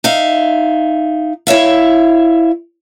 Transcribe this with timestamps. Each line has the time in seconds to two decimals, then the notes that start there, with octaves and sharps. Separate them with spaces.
0.04 D#4 E5 F5
1.47 E4 C#5 E5 F5